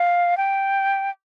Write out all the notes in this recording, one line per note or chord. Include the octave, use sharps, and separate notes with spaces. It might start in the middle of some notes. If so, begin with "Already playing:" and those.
Already playing: F5
G5